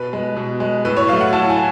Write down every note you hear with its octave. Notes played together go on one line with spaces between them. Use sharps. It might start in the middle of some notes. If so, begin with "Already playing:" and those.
Already playing: B2 B4
G#3
B2
G#3
A2 B4
C#5
F#3 A3 F5
F#5
A2 A5
G#5